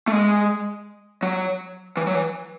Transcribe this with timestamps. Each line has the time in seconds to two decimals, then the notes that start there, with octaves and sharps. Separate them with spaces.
0.08 A3
0.12 G#3
1.23 F#3
1.97 E3
2.07 F#3
2.15 E3